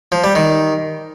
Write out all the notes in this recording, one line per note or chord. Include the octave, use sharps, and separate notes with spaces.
F3
G3
D#3